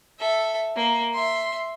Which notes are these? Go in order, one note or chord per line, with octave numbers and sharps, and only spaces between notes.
A4 E5
A#3
E5 C6